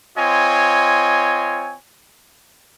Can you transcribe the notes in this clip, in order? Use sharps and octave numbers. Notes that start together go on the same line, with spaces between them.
C4 F4 C#5 D#5 G#5